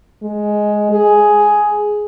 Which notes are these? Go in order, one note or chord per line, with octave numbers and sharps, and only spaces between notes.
G#3
G#4